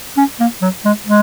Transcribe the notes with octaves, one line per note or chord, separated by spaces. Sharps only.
C#4
A#3
F#3
G#3
G#3